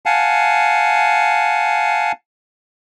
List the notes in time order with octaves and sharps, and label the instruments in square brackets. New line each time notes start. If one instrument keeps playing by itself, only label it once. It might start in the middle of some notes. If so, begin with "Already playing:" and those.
[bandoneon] F5 F#5 G#5 A5